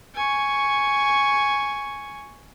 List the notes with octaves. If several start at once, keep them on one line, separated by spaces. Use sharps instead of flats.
G#5 C#6